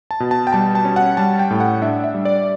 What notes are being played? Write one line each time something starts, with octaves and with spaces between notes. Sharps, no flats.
A5
B2
A5
G5
G3 A5
A5
C#4
F#5
G3 A5
G5
A2
F#5
D4 E5
E5
G3
D5